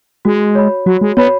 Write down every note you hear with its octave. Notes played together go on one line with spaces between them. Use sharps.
G#3 F#4
C#5 B5
F#3 F#4
G#3
B3 C#5 B5